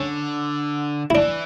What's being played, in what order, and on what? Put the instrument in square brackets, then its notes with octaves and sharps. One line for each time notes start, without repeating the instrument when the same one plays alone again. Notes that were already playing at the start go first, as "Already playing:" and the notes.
Already playing: [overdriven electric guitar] D3 [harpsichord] C#4
[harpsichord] E4
[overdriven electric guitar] E3 [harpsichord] D4